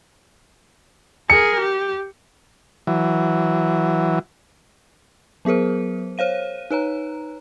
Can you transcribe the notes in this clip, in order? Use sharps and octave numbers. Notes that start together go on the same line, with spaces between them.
G#4 A#4 C#7
G4
E3 F#3
F#3 B3 G#4 A#4 C5
C5 C#5 F5 D#7
D#4 B4 C#5 A#5